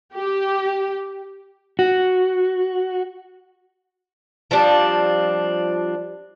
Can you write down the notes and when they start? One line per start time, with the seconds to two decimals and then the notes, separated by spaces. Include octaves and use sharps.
0.15 G4
1.79 F#4
4.51 F3 G3 C4 D4